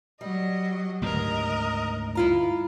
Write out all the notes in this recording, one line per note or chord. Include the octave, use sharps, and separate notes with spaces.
F#3 G3 D#5
D2 G#2 C#3 A#4 D#5
G2 E4 F4 A#5